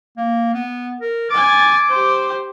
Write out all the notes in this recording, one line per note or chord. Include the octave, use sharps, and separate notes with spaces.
A#3
B3
A#4
G#5 D6 A6
G4 C5